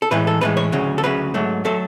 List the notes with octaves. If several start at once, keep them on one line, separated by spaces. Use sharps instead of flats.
A4
A2 E3 G#3 B4
A4
A2 E3 G#3 B4
C#5
D2 C#3 F#3
A4
D2 C#3 F#3 B4
G#2 F#3 A3
F#3 A3 A4